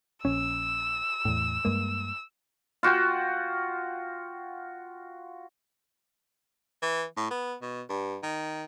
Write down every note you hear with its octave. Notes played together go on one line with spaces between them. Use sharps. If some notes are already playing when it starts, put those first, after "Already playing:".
A#1 C#4 E6
E2 A2
G2 G#3 A#3
F4 F#4 G5
E3
A2
B3
B2
G2
D#3